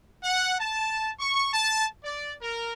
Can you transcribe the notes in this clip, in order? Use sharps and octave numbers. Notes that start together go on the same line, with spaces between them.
F#5
A5
C#6
A5
D5
A#4